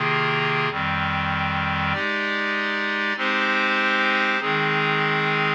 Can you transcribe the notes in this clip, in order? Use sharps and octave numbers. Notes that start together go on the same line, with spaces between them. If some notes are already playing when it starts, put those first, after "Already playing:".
Already playing: C3 D#3 A#3 F4 G#4
F2 D#3 G3 C4
G#3 D#4 G4 D5
G#3 C4 D#4 G4 C5
D#3 G#3 C4 D#4 G#4